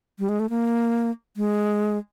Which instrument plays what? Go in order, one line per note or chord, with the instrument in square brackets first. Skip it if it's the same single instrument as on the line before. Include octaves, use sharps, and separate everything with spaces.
[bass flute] G3
G#3
A3
A#3
G#3